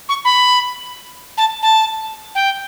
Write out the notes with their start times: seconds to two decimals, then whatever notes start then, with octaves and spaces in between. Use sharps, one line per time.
0.09 C#6
0.25 B5
1.38 A5
1.62 A5
2.35 G5